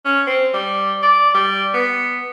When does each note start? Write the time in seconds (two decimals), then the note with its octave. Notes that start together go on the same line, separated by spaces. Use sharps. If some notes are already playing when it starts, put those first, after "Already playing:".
0.05 C#4
0.27 C4
0.54 G3
1.03 D5
1.34 G3
1.74 B3